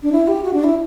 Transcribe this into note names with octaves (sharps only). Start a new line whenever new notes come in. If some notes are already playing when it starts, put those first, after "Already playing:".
D4
E4
G4
F#4
D4
E4